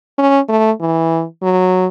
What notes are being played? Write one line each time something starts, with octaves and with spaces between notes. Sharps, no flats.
C#4
A3
E3
F#3